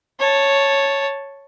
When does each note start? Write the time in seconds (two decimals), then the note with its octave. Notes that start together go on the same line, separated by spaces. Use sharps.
0.19 C#5 A5